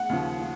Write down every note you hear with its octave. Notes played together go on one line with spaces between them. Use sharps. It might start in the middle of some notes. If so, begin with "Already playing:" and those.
Already playing: F#5
D#2 C#3 F3
F3